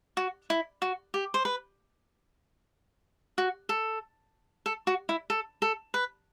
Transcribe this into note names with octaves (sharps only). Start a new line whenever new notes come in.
F#4
E4
F#4
G4
C5
B4
F#4
A4
A4
F#4
E4
A4
A4
B4